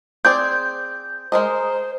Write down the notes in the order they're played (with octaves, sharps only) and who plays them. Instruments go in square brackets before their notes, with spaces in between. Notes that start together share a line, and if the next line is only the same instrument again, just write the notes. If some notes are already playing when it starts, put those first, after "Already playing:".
[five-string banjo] C4 G#4 D5 [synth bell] G6
[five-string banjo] G#3 A#4 D#5 [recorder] C5